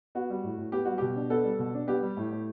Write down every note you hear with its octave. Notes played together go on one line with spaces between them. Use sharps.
B3 F#4
G3
A2
A2
B3 G4
G3 F#4
B2 G4
D4
B3 A4
G3
B2
D4
B3 G4
G3
A2
A2